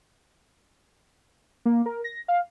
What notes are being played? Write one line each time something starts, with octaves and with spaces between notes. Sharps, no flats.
A#3
A#4
A#6
F5